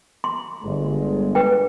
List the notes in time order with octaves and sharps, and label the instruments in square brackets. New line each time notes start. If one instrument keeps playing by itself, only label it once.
[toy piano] C6
[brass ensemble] G1 G#3
[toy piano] B4 G5